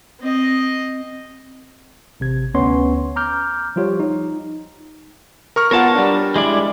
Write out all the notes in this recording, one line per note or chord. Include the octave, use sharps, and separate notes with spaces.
C4 D#5
A1 C3 G#6
D2 B3 C#4 C#5 C6
A#5 D6 F6 G6
F3 G3 F4 G4 C#5
D#4
A#4 C#6 F6
B3 F4 A#4 C#5 F#5 A5
G3 D4
G#3 E4 D5